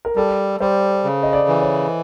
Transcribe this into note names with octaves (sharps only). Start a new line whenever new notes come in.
A#4
G3 A4
G3 C5
C#3
D#5
D5
E3
C#5